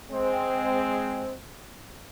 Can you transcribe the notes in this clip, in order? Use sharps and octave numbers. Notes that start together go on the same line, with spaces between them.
G#3 C4